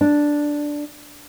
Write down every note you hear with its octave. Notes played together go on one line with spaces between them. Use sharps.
D4